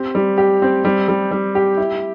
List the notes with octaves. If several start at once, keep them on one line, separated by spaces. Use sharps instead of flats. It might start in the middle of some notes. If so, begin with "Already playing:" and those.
Already playing: C4 G4
G3
G4
C4
G3
G3
G3
G4
E4